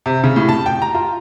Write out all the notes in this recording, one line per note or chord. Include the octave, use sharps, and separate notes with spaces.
C3
C#3
A2
A5
G5
A#5
F4